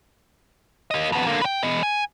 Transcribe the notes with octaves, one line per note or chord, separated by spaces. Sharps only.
A#3 D#5
F2 B3
D3 A#3
B4 G5
E3 D#5
G#5